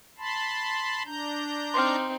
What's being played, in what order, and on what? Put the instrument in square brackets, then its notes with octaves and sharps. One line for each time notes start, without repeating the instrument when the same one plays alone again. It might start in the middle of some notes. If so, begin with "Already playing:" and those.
[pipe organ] A5 B5 C6
D4 A#5 G6
[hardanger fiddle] C4 D#4 [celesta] C6 D6 F6